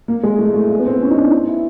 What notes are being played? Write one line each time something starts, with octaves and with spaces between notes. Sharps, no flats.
A#3
G#3
A3
A3
A3
B3
C4
C#4
D#4
D4
D#4
E4